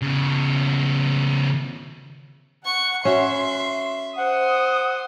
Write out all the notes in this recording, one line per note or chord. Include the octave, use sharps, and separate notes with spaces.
C#3 B3
F#5 C#6
C#4 F#4 E5 C6
C5 F#5 D#6